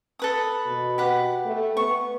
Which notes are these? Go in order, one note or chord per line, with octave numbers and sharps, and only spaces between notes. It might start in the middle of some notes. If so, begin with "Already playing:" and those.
A4 B4 D#6
B2
G4 B4 F#5
A3
B3 C#6